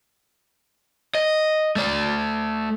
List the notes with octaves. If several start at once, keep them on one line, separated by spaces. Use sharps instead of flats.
D#5
A3 D5